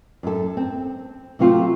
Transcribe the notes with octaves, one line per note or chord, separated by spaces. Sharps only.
F#2 A4
C4
C3 F#3 A3 C4 F4